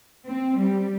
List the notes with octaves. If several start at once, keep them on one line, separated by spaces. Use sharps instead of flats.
C4
G3